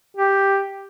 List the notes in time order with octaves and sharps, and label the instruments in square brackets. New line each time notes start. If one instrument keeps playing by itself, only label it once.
[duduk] G4